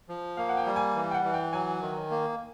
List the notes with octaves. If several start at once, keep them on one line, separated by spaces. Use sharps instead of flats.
F3
A#3 F5
F#5
G5
G3
G#5
E3
G5
F#5
E3
G5
F#3 G#5
D#3
A#3